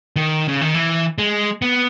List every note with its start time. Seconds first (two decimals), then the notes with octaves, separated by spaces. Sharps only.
0.16 D#3
0.48 C#3
0.61 D#3
0.74 E3
1.18 G#3
1.62 B3